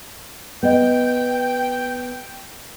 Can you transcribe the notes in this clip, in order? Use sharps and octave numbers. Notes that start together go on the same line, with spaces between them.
B3 D#5 G5